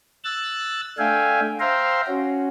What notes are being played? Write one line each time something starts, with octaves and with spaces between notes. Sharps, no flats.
E6 F#6 A6
A3 D4 E5 F5 G5 G#5
C5 E5 F5 G5 A#5 C6
C#4 F#4